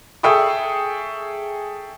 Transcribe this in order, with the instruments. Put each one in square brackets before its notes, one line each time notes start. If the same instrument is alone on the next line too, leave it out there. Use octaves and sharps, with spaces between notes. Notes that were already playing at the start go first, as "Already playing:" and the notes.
[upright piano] G#4 A4 E5 G5 C#6 D#6